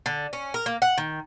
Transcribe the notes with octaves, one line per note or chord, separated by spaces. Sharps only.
D3
C#4
A#4
A#3
F#5
D#3